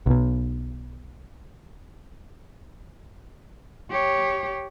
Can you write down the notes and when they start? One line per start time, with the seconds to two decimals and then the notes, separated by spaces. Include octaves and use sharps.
0.06 B1 B2
3.90 G4 C#5